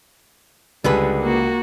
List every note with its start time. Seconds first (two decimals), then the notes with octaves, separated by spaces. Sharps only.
0.84 C#2 D3 G3 G#4 B4
1.20 A#3 F#4